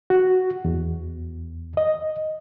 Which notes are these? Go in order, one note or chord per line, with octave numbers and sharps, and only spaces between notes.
F#4
E2
D#5